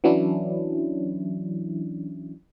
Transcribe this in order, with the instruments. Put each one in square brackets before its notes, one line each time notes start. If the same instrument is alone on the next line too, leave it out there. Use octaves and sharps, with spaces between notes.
[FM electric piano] E3 F#3 C#4 D4 E4